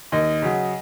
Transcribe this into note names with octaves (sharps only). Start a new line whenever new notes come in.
D#2 D#5
C#3 F#3